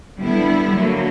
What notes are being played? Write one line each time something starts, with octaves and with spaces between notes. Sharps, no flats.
D3 G3 B3 E4
D3 F#3 A#3